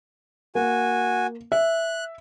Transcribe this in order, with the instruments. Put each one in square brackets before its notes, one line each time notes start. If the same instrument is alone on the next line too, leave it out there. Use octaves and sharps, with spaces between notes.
[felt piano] A#3 [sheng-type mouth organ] F#4 G#5
[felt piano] E5 [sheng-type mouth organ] F#6